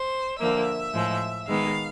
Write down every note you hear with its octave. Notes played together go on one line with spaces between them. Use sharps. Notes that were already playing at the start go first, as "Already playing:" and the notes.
Already playing: C5
D3 F3 A#3 E5
A2 F3 G#3
D#3 G#3 B3 F5